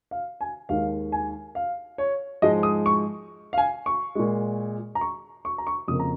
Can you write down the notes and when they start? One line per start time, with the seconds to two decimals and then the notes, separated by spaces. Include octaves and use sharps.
0.11 F5
0.41 G#5
0.69 D#2 D#3 G#3 F5
1.12 G#5
1.55 F5
1.98 C#5
2.42 G#2 F3 G#3 D#5
2.63 D#6
2.86 C#6
3.53 F5
3.58 G#5
3.86 C#6
4.15 A#2 G#3
4.95 A#5
5.01 C#6
5.45 C#6
5.58 A#5
5.67 C#6
5.88 F2 C#3 A#3 D#6
6.00 A#5